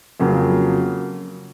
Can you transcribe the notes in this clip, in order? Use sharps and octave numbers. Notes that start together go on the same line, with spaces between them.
F2 C#3 F#3 A#3